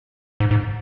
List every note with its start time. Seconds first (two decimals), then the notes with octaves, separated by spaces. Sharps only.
0.40 G#2
0.51 G#2